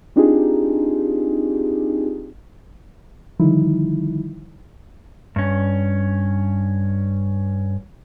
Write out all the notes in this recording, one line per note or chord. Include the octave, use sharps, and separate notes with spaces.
C4 D4 D#4 F4 G4 G#4
D3 D#3 F3 G3 D#4 E4
G2 C#4